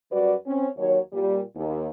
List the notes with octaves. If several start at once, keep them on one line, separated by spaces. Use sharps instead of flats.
F#2 G3 F#4 B4 D5
C4 C#4
D#2 D#3 F#3 C#5
A#2 G3
D#2